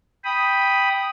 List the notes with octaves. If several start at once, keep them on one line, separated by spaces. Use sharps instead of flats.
G5 B5 D#6